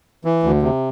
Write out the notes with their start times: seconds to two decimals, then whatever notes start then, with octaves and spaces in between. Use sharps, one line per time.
0.25 E3
0.43 D2
0.62 C3